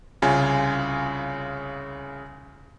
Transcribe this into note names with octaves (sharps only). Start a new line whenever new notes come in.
C2 C#3 F4 G#5